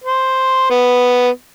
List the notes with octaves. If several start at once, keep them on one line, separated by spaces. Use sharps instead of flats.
C5
B3